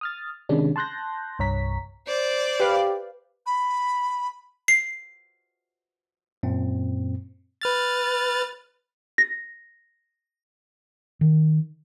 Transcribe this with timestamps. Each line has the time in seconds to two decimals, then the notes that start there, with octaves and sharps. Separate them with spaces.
0.01 D#6 F6 A6
0.49 C3 D#3 G#3 C#4 D4
0.76 A5 C6 F#6 G6 A#6
1.39 C2 G2 C#5 A#5 B6
2.07 C5 D5
2.60 G4 B4 F5
3.46 B5
4.68 C7
6.43 F#2 A#2 C4
7.61 B4 F6 A6
9.18 A#6
11.21 D#3